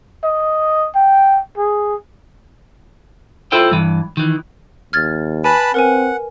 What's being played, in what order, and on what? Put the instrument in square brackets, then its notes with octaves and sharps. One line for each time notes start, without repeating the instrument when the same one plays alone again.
[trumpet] D#5
G5
G#4
[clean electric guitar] E4 F4 A4 C5 G5
G2 E3
D#3 E3
[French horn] D#2 [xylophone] F6 G#6 A6
[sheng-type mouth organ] B4 A5 B5 [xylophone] G#5
[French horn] C4 [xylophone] A#4 B4 G#5 [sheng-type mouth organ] F#5